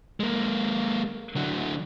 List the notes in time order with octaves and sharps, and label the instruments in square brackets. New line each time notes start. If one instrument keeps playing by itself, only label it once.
[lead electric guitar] G#3 A#3
D3 F#3